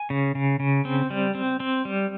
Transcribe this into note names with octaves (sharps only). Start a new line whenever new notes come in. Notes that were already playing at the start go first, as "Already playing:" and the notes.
Already playing: G#5
C#3
C#3
C#3
C4
G3
C4
C4
G3